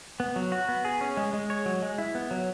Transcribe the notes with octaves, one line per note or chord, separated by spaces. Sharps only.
B3
F#3
F#4
B3
G#4
C#4
G#3
G#3
C#5
F#3
G#3
E4
B3
F#3